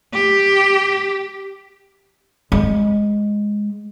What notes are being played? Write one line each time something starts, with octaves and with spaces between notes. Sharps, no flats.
G4
G#3